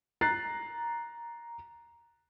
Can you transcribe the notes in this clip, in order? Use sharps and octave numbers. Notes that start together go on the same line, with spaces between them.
A#5 F#6 A6 C7